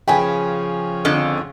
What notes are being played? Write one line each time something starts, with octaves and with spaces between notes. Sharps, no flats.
C#3 F3 C#4 B4 G5 G#5 B5
F2 D3